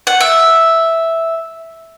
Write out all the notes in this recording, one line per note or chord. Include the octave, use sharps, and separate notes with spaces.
F#5
E5